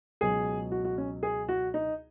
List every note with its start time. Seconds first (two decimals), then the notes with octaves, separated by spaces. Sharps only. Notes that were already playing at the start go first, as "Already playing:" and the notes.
0.21 C#2 B2 F#3 G#4
0.71 F#4
0.84 F#4
0.98 C#4
1.23 G#4
1.48 F#4
1.74 D#4